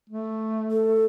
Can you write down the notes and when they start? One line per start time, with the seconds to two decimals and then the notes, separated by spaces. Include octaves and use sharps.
0.10 A3
0.71 A4